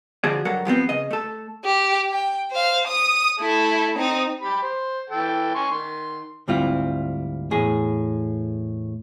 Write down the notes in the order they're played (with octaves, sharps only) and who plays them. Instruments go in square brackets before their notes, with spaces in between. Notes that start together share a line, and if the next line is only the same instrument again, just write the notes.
[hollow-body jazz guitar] D3 F3 F#4 G#4 D5
G2 F#3 A4 A#4 F#5
G2 F3 B3 C4
C#3 D#5
A3 A4
[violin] G4
G5
C5 F5
D#6 D#7
A3 E4
C4 D#4
[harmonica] G4 B5
C5
E3 A4 G5
G#5 C6 C#6
D#3 C6
[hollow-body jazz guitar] D2 G#2 G3 C4 E4 F4
E2 A2 G#4